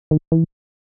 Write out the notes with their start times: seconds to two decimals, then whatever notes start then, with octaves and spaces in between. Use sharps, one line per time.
0.11 D#3
0.32 E3